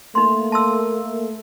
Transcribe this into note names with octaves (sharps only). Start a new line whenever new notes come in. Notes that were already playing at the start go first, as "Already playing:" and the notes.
A3 A#3 D#4 C6
A5 C6 E6